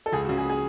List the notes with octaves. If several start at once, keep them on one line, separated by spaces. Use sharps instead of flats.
A4
C#2 G#4
F#4
C#3
G#4
G#4